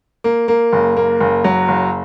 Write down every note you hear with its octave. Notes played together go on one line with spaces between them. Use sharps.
A#3
A#3
F#1
A#3
F#1
F#3
F#1